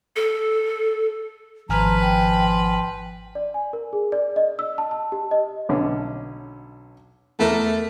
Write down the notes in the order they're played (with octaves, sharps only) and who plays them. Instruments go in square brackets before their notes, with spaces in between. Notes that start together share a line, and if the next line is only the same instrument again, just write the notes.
[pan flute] A4
[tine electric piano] G#1 G#5 F6 [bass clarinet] F3 [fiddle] B4 [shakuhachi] A#5
[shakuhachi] G5
[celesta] D5
G#5
A#4
G#4
D5
D#5
E6
A5
A5
G4
D#5
[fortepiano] B1 D3 C#4
[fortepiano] E2 A#4 [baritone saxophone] A3